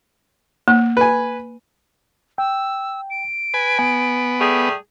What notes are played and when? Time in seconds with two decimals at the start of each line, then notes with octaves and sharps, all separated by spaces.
0.68 A#3
0.97 B4 G#5
2.38 G5 E6
3.10 D7
3.54 B4 G#5
3.79 B3 G#5
4.40 G3 A3 G#4